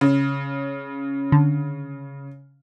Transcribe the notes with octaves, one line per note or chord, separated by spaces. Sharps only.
C#3
D3